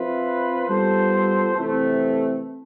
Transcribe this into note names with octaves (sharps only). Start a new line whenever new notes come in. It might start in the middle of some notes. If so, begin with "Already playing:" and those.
Already playing: F3 C4 F4 B4 E5
G3 B3 F4 A4 C5
C3 E3 A3 C4